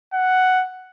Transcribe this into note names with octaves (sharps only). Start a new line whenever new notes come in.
F#5